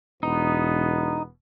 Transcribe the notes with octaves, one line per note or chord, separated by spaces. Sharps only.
E1 B3 D#4